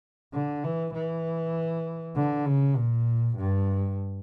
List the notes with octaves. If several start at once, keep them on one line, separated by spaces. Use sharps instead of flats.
D3
E3
E3
D3
C#3
A#2
G2